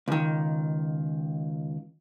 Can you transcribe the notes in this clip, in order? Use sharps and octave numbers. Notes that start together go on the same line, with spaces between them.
C#2 D#3